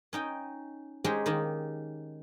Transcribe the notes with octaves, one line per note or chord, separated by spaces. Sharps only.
C#4 D#4 G5
G#3 C#4 D#4 G4 G#4 C5
D#3 A#3 D#4